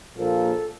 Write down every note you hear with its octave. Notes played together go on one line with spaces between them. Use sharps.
A#1 A#2 F3 A#3 A4